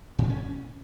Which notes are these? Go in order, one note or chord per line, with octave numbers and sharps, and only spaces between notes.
A2
A3
C#4